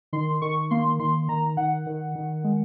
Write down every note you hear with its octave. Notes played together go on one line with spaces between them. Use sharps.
D#3 C6
D#3 C#6
A#3 C6
D#3 C6
D#3 A#5
D#3 F#5
D#3
D#3
G#3